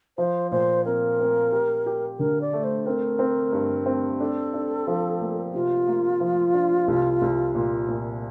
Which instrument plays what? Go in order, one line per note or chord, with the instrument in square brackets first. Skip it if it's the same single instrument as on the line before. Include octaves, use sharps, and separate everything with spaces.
[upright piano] F3 [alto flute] C5
[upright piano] A#2 [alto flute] C5
[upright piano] C4 [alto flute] A#4
[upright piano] C4
G4
G4
[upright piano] D3 [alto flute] A#4
[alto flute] D5
[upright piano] A3
[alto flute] C5
[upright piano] C4 [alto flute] A#4
[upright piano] C4
G2
C4
[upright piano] D4 [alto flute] A4
[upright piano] D4
F3
A#3
[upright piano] C3 [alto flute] F4
[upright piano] A#3
F3
D4
C2
C2
A#2
A#2